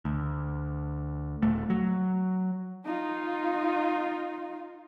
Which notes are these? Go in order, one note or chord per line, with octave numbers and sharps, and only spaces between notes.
D2
D#1 A3
F#3
D#4 F4